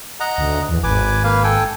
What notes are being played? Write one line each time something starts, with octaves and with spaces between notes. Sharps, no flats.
D#5 F#5 A#5
D2
E2
G#1 B4 G#5 D6
A#3 B4 F5
A4 G5 G#5